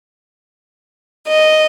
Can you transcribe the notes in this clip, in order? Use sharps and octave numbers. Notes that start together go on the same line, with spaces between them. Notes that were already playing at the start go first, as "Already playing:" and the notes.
D#5